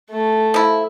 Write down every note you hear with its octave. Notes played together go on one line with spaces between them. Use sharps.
A3
F3 E4